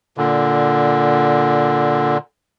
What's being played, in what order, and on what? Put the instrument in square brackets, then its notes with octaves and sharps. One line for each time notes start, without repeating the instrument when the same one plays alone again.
[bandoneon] A#2 D3